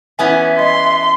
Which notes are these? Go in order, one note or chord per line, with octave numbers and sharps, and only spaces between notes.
E3 B3 C#4 E5 G#5
D#5 C6 B6